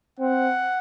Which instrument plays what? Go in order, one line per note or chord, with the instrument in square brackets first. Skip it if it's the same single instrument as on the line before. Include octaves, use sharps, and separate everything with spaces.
[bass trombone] C4 [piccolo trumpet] F#5